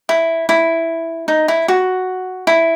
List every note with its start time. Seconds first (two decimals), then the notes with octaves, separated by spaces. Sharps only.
0.09 E4
0.49 E4
1.28 D#4
1.48 E4
1.68 F#4
2.47 E4